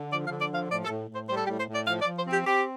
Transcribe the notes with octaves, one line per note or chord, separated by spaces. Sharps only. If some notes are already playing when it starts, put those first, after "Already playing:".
Already playing: D3
F3 D5
F5
D3
D5
F3 F5
A2 D5
A4
A2
A2 C5
G3 C5
A4
G4
A2
C5
A2 D5
F3 F5
D5
F3
C5
C4 G4
C4 G4